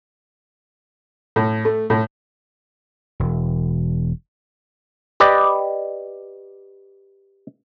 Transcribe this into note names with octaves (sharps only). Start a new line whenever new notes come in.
A2
A3
A2
E1
G4 B4 D5 D#5